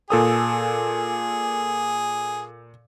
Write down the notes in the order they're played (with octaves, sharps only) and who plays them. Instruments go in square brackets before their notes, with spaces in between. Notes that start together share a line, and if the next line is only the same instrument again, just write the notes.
[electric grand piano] A#2 A4 D#6 [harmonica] G#4